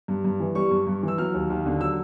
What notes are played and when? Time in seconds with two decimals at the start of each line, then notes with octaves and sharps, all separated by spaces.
0.08 G2
0.24 G2
0.40 E3
0.55 G3 C#6
0.71 G2
0.87 G2
1.03 E3
1.08 E6
1.18 F#3 F6
1.34 D#2
1.50 D#2
1.66 D3
1.80 F#3 E6